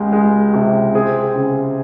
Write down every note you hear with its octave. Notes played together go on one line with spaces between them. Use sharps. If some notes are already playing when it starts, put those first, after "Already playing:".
Already playing: C#2 G#3 G4
G#3
C3
C4 G#4
C#3